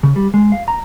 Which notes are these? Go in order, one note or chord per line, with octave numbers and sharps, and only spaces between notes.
C#3
G3
G#3
F5
A#5